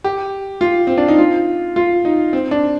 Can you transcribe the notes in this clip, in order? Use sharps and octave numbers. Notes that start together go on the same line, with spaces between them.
G4
F4
C4
D4
D#4
F4
F4
D#4
C4
D4